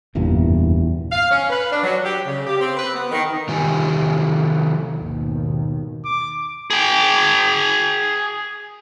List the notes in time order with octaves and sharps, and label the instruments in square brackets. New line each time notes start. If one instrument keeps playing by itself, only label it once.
[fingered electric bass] F#1 E2 G2 A#2
[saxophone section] F5
C#4
B4
D4
F#3
G4
C#3
G4
C4
B4
B3
D#3
[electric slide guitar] C3 D#3 F4 G4 G#5
[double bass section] G#1 D#2 B2 D#3
[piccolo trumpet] D6
[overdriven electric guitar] G#4 G5